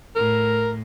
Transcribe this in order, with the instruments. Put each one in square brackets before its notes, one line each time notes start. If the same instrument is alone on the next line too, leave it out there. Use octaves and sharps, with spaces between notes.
[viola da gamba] A2 [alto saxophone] A#4